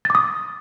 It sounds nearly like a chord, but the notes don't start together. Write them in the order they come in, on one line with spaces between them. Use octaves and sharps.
A6 D6 D#6